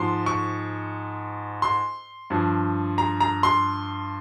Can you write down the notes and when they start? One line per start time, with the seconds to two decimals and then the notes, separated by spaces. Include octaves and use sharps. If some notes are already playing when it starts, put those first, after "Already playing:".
Already playing: G#2 F3 C6
0.26 C#6
1.62 C6
2.30 G2 F3
2.98 A#5
3.20 A#5
3.43 C6